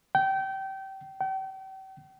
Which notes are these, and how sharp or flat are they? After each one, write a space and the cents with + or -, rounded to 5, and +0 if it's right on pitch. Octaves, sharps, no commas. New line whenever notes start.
G5 -25
G5 -40